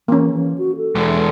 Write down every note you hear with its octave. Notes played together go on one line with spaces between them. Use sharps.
E3 A#3 C#4
E3
F#4
A4
E2 G#3